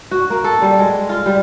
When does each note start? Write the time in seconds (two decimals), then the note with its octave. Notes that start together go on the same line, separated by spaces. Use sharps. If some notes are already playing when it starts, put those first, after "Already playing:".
0.11 F#4
0.30 A#3
0.44 A4
0.62 G3
0.79 G#3
1.09 F4
1.26 G3